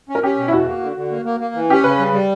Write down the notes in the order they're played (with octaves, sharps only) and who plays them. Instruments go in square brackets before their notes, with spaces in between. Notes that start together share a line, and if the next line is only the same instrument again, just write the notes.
[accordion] C#4
[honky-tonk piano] A#4
[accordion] C#4 [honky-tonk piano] G4
[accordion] B2
[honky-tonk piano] E4
[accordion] E2 [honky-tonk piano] F#4
[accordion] A#3
D3
D3
A#3
A#3
A#3
E3
[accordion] C#4 [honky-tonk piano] G4
[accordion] C#3 [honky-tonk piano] B4
[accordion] G3
G3